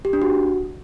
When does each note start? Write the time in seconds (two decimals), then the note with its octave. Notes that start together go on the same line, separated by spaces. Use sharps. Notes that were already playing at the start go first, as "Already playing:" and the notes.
0.05 G4
0.13 D4
0.22 F#4